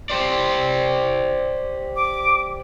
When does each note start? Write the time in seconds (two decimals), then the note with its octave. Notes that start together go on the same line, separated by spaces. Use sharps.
0.10 G4 C5 D5
1.96 D6